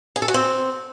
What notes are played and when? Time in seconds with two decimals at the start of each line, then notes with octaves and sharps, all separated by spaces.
0.16 G#4
0.22 A4
0.28 F#4
0.34 C4